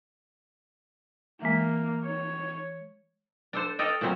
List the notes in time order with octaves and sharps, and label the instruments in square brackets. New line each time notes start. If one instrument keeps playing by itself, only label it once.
[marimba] E3 G#3 [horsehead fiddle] A#3
[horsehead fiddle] C#5
[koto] D4 A4 C5
A4 D5 D#5 F5 G5
A#2 C#3 F#3 C4